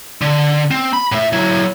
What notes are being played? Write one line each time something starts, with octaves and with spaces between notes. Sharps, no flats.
D3
C4
B5
A2 E5
F#3 E4